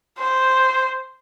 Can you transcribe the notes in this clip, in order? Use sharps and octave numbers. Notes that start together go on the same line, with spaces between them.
C5